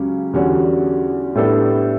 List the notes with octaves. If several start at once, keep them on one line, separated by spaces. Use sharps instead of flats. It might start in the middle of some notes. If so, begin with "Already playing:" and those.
Already playing: C#2 C#3 F#3 C#4 G4
E2 D3 G3 C#4 F#4
A2 G3 B3 D4 A4